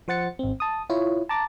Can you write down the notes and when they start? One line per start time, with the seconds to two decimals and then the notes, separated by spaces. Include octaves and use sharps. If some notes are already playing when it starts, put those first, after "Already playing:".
0.08 F3 C5 F#5 A6 C#7
0.39 G#1 C4
0.60 A5 D#6
0.90 E4 F4 C#5
1.29 A5 A#5 D6 A6